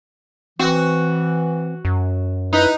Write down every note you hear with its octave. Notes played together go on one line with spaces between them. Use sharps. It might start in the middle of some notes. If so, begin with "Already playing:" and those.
E3 C4 F#4
F#2
D#4 E4 B4